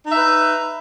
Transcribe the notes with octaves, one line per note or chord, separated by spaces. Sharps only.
D#4 B4 E5